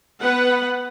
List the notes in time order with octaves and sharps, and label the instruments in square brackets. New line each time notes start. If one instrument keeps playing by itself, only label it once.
[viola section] B3 B4 F#5